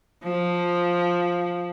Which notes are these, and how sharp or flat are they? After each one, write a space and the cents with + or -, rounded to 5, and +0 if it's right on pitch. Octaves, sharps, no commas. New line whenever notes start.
F3 +5